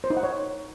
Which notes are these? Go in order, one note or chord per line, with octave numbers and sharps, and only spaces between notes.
C5
D#4
F#5
C#5